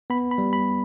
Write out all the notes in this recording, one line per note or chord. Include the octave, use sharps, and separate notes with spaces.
B3 B5
B5
G3
B5